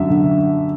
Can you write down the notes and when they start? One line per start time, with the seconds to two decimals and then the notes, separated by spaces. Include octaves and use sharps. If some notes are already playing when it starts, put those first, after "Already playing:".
Already playing: F#2 D3 E5
0.10 D3